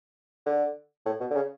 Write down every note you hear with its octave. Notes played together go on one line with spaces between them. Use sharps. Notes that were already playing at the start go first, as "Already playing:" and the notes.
D3
A2
B2
D3
C#3